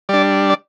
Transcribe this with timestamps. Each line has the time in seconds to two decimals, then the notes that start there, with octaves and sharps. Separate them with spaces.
0.09 G3 D4 D5
0.50 D5